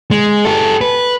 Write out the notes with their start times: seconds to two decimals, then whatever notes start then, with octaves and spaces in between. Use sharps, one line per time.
0.11 G#3
0.45 G4 A4
0.81 B4